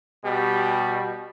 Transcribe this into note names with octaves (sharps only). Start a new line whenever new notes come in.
B2 G3 G4